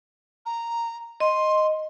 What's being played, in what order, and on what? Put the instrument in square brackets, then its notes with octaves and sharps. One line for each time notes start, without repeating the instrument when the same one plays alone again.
[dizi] A#5
[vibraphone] D#5 [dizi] C6